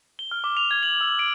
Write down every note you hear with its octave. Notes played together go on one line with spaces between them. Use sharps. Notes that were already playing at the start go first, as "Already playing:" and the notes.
G7
F6
D6
F7
G#6
F#7
E6
D7